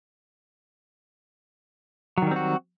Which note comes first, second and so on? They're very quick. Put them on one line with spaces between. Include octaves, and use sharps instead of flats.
F#3 D#3 G3 C4 F#4